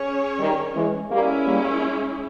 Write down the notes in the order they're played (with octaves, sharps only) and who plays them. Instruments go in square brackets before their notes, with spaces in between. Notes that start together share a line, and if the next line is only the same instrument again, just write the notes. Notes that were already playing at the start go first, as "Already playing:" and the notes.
Already playing: [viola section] C#4 G#4 C#5
[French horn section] D#3 G3
E3 G#3
[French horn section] G3 A#3 [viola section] G#3 C#4 E4
[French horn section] G3 A#3